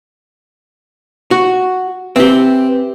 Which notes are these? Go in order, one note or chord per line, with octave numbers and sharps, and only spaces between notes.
F#4
E3 C4 G4